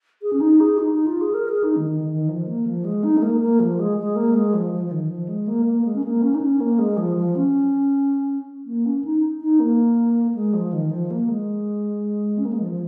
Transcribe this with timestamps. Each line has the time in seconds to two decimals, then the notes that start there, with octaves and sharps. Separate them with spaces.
0.22 G#4
0.33 C#4
0.40 D#4
0.60 G#4
0.78 D#4
0.92 D#4
1.06 F4
1.21 G#4
1.34 A#4
1.49 G#4
1.63 D#4
1.76 D#3
1.91 D#3
2.09 D#3
2.28 F3
2.47 A#3
2.66 F3
2.84 G#3
3.03 D#4
3.17 G#3
3.22 A#3
3.41 A#3
3.60 F3
3.79 G#3
3.97 G#3
4.16 A#3
4.34 G#3
4.54 F3
4.73 F3
4.86 F3
4.91 D#3
5.09 F3
5.28 G#3
5.47 A#3
5.66 A#3
5.85 G#3
5.95 C#4
6.04 A#3
6.22 C#4
6.34 D#4
6.41 C#4
6.60 A#3
6.79 G#3
6.97 F3
7.16 F3
7.35 C#4
8.66 A#3
8.86 C#4
9.04 D#4
9.41 D#4
9.60 A#3
10.35 G#3
10.54 F3
10.73 D#3
10.91 F3
11.10 A#3
11.29 G#3
12.38 C#4
12.45 A#3
12.53 G#3
12.60 F3
12.72 F3